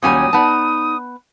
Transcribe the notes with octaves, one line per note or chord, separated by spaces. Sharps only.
D#2 A#2 F#3 G3 C#4 G#5 D#6
B3 D#4 D5 A5